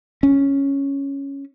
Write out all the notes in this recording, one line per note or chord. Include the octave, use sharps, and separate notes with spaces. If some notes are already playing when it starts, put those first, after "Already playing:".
C#4